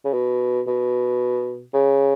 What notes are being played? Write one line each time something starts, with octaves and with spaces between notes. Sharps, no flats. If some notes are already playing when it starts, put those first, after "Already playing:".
C#3
B2
B2
C#3